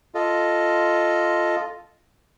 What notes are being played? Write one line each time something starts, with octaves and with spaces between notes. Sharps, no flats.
F4 A4 D#5